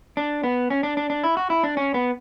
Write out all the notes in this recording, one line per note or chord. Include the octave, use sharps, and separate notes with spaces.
D4
B3
C#4
D4
D4
D4
E4
F#4
E4
D4
C#4
B3